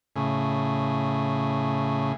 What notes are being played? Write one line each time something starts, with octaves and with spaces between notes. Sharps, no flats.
A2 C#3